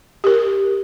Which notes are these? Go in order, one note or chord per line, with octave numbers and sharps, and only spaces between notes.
G4 A#4